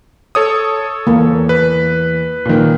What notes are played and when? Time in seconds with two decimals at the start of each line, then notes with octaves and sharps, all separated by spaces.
0.35 A4 C#5 D#6
1.07 E2 A#3
1.49 B4
2.45 A#2 D#3